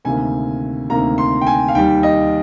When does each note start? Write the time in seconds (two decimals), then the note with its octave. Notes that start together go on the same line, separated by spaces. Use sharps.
0.05 D2 C3 D#3 A#3 G#5
0.90 D2 C3 D#3 A#3 A#5
1.18 C6
1.41 G5
1.47 G#5
1.68 F5
1.75 D#2 D#3 G3 G5
2.03 D#5